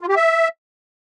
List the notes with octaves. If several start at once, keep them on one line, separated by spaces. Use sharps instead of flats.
F4
G4
E5